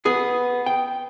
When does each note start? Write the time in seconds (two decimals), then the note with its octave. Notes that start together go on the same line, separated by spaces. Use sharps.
0.05 B3 G#4
0.66 G5